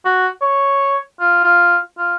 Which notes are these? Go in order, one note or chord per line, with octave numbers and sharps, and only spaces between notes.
F#4
C#5
F4
F4
F4